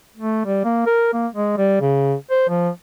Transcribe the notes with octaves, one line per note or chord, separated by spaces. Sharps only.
A3
G3
A#3
A#4
A#3
G#3
G3
C#3
C5
F3